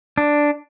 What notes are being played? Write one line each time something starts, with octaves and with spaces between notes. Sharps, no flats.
D4